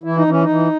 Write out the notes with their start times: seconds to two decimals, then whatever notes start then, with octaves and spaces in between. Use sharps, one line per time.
0.04 E3 E4
0.17 D#4
0.27 E3 C#4
0.42 D#4
0.49 E3